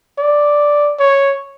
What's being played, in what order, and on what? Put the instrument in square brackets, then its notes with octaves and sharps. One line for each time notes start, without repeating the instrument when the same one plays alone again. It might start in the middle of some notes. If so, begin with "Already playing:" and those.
[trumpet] D5
C#5